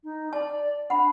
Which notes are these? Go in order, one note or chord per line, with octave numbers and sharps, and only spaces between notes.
D#4
D5 A5
D4 F#5 B5